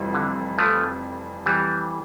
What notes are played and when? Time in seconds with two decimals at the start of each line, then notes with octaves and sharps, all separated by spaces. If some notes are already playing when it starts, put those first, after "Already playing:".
Already playing: F1 F2 E3 G3
0.14 D3
0.58 F3 A3
1.46 E3 G3